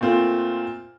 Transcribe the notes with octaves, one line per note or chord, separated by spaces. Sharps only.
A#2 A3 C4 F4